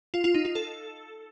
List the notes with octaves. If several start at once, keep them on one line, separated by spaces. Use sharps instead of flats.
F4
F4
D#4
F4
A4